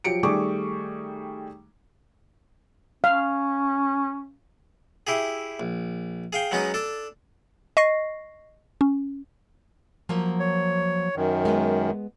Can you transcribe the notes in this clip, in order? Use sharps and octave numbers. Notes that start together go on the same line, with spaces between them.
F3 F#3 G4 C#7 D7
D#3 G3 A3 G#4 C#6 D6
C#4 F5
E4 G4 G#4
A#1
G#4 F5 G5
F#3 G#3 B3 C#4 D#4
D4 A4
D#5 C#6 A#6 C7
C#4
F3 F#3 A#3
C#5
F#2 D#3
G#3 B3